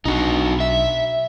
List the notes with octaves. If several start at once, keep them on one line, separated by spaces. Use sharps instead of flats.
B1 D4 D#4 F#4
E5